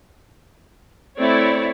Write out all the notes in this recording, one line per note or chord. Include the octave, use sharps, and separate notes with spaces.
A3 C4 E4 C#5 D5